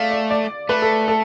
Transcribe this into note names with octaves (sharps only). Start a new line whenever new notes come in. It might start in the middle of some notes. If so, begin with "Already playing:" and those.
Already playing: A3 D5 F5
D5
D5
A3 B4
A4
A4